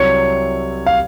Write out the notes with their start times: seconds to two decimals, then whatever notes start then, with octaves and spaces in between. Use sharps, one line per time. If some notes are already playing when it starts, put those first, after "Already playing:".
Already playing: C2 C3 F#3 C#5
0.86 F5